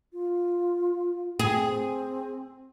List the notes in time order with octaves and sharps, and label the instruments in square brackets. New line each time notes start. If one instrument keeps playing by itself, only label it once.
[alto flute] F4
[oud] G#4
[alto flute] C4